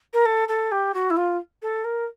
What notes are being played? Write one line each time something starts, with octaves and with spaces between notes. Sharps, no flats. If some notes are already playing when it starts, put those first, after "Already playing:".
A#4
A4
A4
G4
F#4
E4
F4
A4
A#4